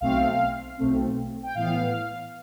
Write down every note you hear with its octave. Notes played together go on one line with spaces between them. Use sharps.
B1 B2 A3 C4 F5
B1 B2 A3 C4
G5
A2 E3 B3 F5